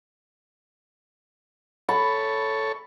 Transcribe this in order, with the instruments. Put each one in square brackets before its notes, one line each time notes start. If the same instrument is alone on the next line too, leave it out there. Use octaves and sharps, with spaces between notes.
[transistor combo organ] A4 C#5 [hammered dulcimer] B5